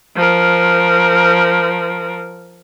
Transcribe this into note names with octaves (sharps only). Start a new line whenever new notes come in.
F3 A#4